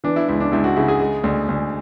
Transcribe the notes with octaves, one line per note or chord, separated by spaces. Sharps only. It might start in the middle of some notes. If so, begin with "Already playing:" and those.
E3 D4
E4
C#2 E4
D4
C#2 E4
F#4
C#3 E4
G#4
G#3
D2
D2